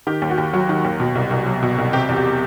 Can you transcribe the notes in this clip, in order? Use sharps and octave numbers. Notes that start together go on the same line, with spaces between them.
D#3 G4
D#2
F#4
D#2
F#3 F#4
D#3
D#2
B2
C2
C2
F#3
B2
C2
C3 G4
E2
G4